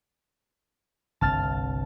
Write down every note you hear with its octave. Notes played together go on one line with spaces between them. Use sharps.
G1 C2 A5 F6 A6